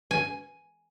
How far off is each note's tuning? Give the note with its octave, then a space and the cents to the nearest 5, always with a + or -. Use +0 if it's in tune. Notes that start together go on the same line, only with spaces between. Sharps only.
G#5 +5